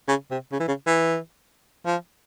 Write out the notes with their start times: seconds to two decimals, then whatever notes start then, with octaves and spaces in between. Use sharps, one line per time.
0.08 C#3
0.31 C3
0.52 C#3
0.60 E3
0.68 C#3
0.86 E3
1.86 F3